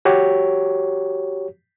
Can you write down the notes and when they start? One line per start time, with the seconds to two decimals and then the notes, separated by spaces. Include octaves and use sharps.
0.05 F#4 G4 C#5